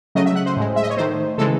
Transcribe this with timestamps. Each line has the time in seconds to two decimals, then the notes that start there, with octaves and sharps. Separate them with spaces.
0.15 C#3 F#3 A3 D#5
0.26 E5
0.36 F#5
0.46 C5
0.57 A2 G#3
0.76 E5
0.83 D#5
0.90 C#5
0.97 D#3 A3 C5
1.38 C#3 E3 G#3 A4